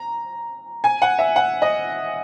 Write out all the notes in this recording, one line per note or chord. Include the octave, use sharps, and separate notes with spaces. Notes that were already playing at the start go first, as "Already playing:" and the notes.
Already playing: A#5
G#5
F#5
E5
F#5
D#5